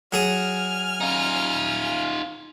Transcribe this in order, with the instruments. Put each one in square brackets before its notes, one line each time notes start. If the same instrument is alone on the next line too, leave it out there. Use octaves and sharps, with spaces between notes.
[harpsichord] F#3 G#4 D#6 [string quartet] G#5 F6
[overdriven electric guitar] D#4 F4